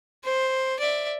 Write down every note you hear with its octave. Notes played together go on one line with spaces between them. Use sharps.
C5
D5 E5